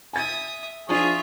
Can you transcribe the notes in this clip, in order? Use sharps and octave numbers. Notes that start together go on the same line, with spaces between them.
E5 G#5 D#6 A6
F3 D4 F4 G#4 E5 C#6